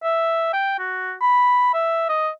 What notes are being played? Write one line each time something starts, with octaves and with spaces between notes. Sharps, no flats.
E5
G5
F#4
B5
E5
D#5